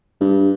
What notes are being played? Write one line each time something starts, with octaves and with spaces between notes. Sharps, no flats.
G2